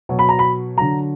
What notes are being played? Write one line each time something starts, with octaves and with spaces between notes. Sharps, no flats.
B2 F#3
B5
A#5
B5
D3 F#3 A#5